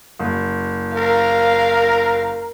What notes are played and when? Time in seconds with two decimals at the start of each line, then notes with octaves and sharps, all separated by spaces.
0.19 F#1
0.95 A#4 F5